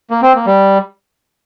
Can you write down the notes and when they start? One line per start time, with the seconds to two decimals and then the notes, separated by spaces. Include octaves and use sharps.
0.10 A#3
0.22 C4
0.35 A#3
0.46 G3